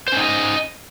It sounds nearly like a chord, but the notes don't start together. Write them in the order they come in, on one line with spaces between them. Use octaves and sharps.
C5 C#4 D#4 D#5